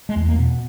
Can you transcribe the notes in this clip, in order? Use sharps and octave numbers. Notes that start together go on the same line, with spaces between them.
G#3
E2 A3
A#3
B2 B3